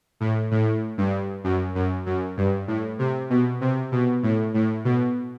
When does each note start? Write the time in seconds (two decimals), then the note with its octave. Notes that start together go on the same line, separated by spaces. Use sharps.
0.20 A2
0.51 A2
0.98 G2
1.44 F#2
1.75 F#2
2.06 F#2
2.37 G2
2.68 A2
2.99 C3
3.30 B2
3.61 C3
3.92 B2
4.23 A2
4.54 A2
4.85 B2